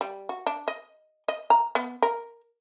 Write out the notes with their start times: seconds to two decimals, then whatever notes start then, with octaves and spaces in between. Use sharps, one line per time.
0.01 G3
0.29 F#4
0.46 D4
0.68 D#5
1.28 D#5
1.50 A#5
1.75 B3
2.02 A#4